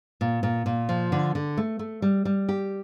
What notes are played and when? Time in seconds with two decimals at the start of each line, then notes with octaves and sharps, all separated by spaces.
0.21 A#2
0.43 A#2
0.66 A#2
0.89 F3
1.12 D3
1.35 D3
1.57 A3
1.79 A3
2.02 G3
2.25 G3
2.49 G4